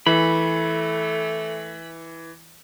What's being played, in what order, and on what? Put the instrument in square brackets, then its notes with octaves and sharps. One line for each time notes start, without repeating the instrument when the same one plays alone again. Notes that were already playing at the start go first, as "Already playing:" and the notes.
[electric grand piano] E3 [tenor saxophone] A3 [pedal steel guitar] B5